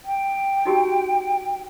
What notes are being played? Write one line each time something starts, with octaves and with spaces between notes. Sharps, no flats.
G5
D#4 F#4 G4